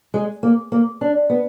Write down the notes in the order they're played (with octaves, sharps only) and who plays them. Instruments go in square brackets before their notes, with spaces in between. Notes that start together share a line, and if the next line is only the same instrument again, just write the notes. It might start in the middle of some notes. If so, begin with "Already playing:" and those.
[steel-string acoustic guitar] G#3
A#3
A#3
D4
B3